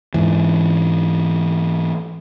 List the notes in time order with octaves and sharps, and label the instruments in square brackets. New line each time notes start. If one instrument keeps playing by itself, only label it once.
[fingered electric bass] G#2 E3